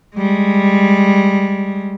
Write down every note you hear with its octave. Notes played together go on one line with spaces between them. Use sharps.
G3 G#3